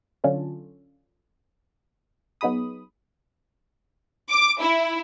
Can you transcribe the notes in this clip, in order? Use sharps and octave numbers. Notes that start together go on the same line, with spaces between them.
D3 F#3 C#4 D4 F4 A4
F#3 B3 D#4 G#4 B5 D#6
D6
E4